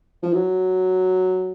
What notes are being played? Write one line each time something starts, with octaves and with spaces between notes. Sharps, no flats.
F3
F#3